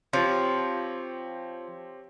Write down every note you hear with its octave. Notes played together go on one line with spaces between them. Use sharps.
F3 C4 G4 C#5